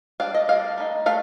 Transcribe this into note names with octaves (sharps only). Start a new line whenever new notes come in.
G3 D4 F5
D#5
G3 D4 F5
A3 D#4
A3 F5